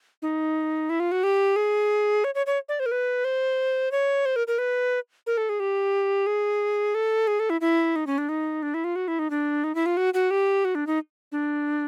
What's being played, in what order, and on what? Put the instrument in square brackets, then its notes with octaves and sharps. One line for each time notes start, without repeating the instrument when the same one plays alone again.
[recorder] D#4
E4
F4
F#4
G4
G#4
C#5
C#5
C#5
D5
C5
A#4
B4
C5
C#5
C5
A#4
A#4
B4
A#4
A4
G#4
G4
G#4
A4
G#4
A4
E4
E4
D#4
C#4
D4
D#4
D4
E4
F4
F#4
E4
D#4
D4
D#4
E4
F4
F#4
F#4
G4
F#4
D4
D#4
D4